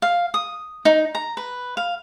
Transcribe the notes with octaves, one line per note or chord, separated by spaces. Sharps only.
F5
D#6
D#4
A#5
B4
F5